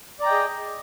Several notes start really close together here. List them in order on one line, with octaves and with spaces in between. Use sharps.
D5 A#5 G5 D#5 G#4